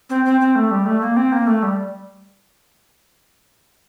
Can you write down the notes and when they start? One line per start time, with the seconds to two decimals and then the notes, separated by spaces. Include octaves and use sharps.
0.10 C4
0.25 C4
0.41 C4
0.56 A3
0.71 G3
0.86 A3
1.01 A#3
1.17 C4
1.32 A#3
1.47 A3
1.63 G3